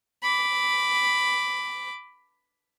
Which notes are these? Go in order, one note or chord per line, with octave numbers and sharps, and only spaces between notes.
B5 D6